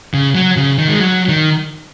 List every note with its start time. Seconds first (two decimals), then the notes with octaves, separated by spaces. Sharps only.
0.14 C#3
0.35 F#3
0.56 C#3
0.78 D#3
0.88 G#3
0.99 F#3
1.29 D#3